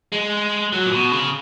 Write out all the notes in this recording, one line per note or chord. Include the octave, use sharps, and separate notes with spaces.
G#3
F#3
A#2
B2
C#3